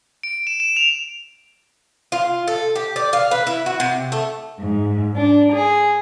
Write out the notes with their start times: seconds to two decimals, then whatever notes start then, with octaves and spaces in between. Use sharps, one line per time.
0.23 D7
0.47 E7
0.60 E7
0.76 F7
2.12 F4
2.48 A4
2.75 G4
2.96 D5
3.13 F5
3.31 B4
3.47 E4
3.66 F#4
3.80 C3
4.12 A3
4.59 G#2
5.16 D4
5.53 G#4